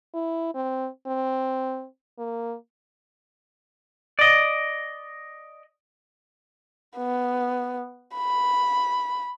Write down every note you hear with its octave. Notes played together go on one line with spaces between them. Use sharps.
E4
C4
C4
A#3
D5 D#5
B3
B5